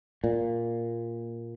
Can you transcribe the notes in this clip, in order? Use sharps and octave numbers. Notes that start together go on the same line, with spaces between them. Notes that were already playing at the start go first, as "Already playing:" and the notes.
A#2